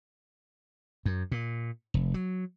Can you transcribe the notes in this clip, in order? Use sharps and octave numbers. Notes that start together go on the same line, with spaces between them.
F#2
A#2
F1
F#3